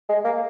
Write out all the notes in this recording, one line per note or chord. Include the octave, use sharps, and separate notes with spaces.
G#3
A#3